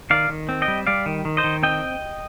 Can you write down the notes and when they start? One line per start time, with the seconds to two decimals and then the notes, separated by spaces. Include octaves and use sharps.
0.10 D#3 D5 F5
0.30 D#3
0.49 C4
0.62 D#5 G5
0.68 G3
0.87 G3 D5 F5
1.06 D#3
1.25 D#3
1.37 C5 D#5
1.44 D#3
1.63 C4 D#5 G5